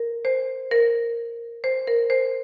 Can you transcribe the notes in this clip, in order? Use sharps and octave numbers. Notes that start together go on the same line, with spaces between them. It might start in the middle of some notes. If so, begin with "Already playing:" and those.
Already playing: A#4
C5
A#4
C5
A#4
C5